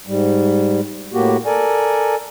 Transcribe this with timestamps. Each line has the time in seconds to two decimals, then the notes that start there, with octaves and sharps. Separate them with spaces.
0.07 G#2 G3
1.13 A2 A#3 F#4 G4
1.46 A4 A#4 D5 G#5